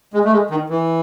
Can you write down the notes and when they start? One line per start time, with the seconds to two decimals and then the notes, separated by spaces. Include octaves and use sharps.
0.14 G#3
0.25 A3
0.32 G#3
0.50 D#3
0.70 E3